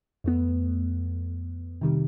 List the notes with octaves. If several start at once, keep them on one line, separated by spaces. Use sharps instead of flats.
F2 A3 B3
C3 D#3 G3